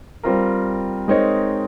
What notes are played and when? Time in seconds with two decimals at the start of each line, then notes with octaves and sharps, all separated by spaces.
0.23 G3 C4 F4 A#4
1.08 G#3 C4 D#4 A#4 C#5